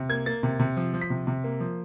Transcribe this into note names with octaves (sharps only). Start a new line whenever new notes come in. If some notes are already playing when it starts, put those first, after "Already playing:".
Already playing: C3
A#3 G#6
A#3 A6
C3
C3
F3
F3
B6
C3
C3
A#3
F3